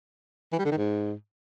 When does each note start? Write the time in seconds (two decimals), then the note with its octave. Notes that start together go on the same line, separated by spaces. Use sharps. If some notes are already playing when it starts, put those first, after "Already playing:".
0.53 E3
0.59 G3
0.65 D3
0.71 D#3
0.77 G#2